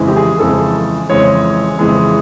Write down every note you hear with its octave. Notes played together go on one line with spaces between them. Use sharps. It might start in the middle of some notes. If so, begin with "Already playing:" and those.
Already playing: F2 C#3 E3 G#3
G4
G#4
F2 C#3 E3 G#3 A4
F2 C#3 E3 G#3 C#5
F2 C#3 E3 G#3